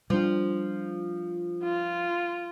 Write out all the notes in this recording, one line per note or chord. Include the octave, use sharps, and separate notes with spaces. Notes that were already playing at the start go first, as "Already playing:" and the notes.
F3 G3 D4
F4